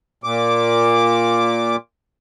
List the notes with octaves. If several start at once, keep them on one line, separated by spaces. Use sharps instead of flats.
A#2 D6